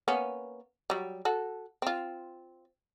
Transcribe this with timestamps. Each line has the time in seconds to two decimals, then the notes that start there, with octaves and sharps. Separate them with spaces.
0.08 A#3 B3 C#4
0.90 F#3 G3
1.25 F#4 A4
1.82 C4 F4